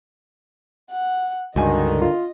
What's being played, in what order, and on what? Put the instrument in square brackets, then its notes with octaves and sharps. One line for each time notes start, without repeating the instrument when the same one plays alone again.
[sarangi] F#5
[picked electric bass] C#2 G2 [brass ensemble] D3 D#3 [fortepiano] F#4 G#5 [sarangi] D#5
[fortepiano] F4